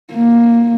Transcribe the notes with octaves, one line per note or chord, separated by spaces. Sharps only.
A#3